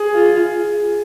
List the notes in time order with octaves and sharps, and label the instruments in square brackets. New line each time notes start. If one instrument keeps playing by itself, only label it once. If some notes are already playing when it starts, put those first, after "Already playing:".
Already playing: [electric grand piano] G#4
[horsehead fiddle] F4